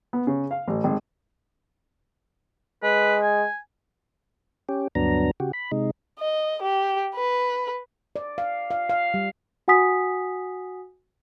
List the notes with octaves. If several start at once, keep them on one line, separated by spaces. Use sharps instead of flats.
B3
C#3
F5
A1
G#1
G#3 B4
G#5
C#4 G4
D2 G2 F#3 B3 D4 A#5
C#3 F#4 G4
B5
C3 G#3 D#4
D#5
G4
B4
D5
F5
F5
F5
G3
F#4 F#5 G#5 D#6 B6